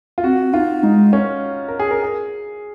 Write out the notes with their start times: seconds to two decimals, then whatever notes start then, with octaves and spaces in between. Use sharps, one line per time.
0.18 F4
0.24 C4 F#4
0.53 D#4 F4
0.83 G#3 D#4
1.13 C#4
1.68 A#4
1.79 G#4
1.91 A#4
2.02 G#4